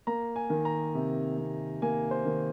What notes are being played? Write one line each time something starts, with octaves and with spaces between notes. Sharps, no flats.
A#3 A#5
G#5
D#3
A#5
C3
C3
A#3 G#5
C5
D#3